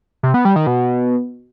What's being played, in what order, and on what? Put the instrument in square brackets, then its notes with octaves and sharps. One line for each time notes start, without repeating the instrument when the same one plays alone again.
[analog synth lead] C3
B3
G3
D#3
B2